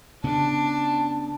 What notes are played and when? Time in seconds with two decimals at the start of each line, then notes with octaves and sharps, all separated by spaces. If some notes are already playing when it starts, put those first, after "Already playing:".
0.24 C#3 B3 D4 A5